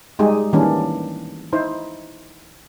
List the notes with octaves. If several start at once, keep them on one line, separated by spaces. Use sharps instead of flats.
G3 G#3 D#4 G4 G#4
D#3 E3 G3 A#3 C#4 D4
D#4 E4 C5